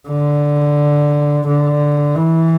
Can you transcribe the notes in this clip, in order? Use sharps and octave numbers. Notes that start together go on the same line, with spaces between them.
D3
D3
E3